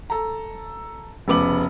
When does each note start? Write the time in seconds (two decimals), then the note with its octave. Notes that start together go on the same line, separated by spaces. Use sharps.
0.10 A4 A#5
1.28 F1 C#3 B3 D6 F#7